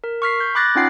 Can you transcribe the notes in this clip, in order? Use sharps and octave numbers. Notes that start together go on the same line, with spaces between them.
A#4
C#6 F6 B6 C7
G6
B5 D6 F#6 A6 A#6
C#4 D#4 F4 F#5 G5 C7